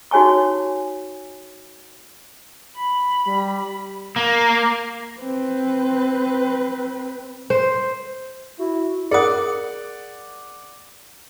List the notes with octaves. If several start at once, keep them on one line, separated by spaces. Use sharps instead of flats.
D#4 F#4 C#5 G#5 C#6
B5
G3
A#3
C4 B4
C5
E4 F#4
G#4 A#4 D5 F#5 D#6